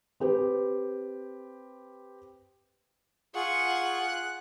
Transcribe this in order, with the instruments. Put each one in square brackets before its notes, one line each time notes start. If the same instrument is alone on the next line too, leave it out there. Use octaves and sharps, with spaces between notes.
[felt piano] C4 G4 B4
[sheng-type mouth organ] F4 G#4 C#6 [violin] F#5
[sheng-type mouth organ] F#6